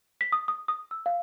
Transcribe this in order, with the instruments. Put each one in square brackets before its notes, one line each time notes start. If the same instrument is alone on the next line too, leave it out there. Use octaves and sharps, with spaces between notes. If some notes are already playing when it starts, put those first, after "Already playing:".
[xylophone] B6
D#6
D#6
D#6
E6
F5